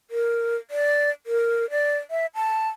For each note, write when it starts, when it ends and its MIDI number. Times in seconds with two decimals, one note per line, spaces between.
0.10 0.56 70
0.71 1.10 74
1.26 1.69 70
1.70 1.97 74
2.11 2.26 76
2.35 2.69 81